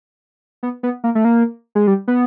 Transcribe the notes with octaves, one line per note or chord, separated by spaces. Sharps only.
B3
B3
A#3
A3
A#3
G#3
G3
B3